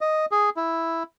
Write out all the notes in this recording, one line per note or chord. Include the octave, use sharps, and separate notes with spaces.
D#5
G#4
E4